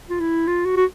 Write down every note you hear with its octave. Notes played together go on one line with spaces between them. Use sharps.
F4
E4
F4
F#4
F#4